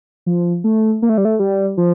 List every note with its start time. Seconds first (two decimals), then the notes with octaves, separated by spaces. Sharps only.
0.26 F3
0.64 A3
1.02 A#3
1.09 A3
1.18 G3
1.25 A3
1.40 G3
1.77 F3